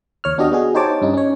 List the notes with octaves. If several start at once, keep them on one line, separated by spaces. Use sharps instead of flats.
D#2 C#5 F6
B3 D4 F#4 G4 D#5
B3 F#4 G#4
D#4 G4 C5 C#5 A5 D6
G2 C#4 D#4
C#4 C#5